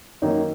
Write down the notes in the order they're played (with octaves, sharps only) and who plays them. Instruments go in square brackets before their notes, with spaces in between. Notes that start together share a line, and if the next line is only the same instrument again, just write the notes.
[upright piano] F#2 D#3 A#3 [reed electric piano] D#4